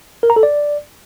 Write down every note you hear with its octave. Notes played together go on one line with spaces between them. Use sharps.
A#4
A#5
A4
D5